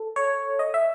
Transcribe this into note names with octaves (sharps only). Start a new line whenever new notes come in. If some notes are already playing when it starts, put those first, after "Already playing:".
Already playing: A4
C#5
D#5
E5